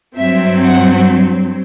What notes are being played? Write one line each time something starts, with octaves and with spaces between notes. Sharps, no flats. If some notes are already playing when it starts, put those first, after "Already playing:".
G2 F#3 C4 E5
F#5